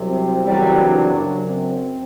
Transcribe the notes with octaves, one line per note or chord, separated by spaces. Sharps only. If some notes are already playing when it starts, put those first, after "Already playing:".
Already playing: C2 C3 F#3
C4
F#1 E2 C3 F#3 G3
D4
F#1 F#2 F#3
C4